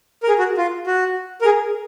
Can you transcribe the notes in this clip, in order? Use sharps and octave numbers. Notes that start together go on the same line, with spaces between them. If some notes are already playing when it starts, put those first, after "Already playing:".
A#4
G#4
F#4
F4
F#4
A#4
G#4